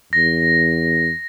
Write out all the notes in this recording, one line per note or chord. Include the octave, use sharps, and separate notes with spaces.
E2 A#6